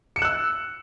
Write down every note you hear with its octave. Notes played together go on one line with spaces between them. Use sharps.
E6 F#6 C#7 E7